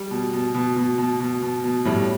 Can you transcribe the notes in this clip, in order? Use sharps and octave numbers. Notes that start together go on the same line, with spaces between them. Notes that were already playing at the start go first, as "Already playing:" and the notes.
Already playing: G3
B2
B2
B2
B2
B2
B2
B2
B2
A2 G3